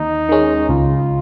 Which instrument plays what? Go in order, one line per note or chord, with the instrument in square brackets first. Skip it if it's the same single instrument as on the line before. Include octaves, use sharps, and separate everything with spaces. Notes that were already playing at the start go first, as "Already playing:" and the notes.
Already playing: [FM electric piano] D#2 [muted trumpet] D#4
[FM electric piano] D#3 G#3 C#4
[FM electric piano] C#2 [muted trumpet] F4